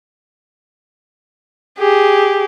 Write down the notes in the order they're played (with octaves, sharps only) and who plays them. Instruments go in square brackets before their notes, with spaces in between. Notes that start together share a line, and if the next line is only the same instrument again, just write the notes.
[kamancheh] G4 G#4